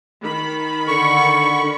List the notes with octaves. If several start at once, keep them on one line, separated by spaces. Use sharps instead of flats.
D#3 B5
D3 C#6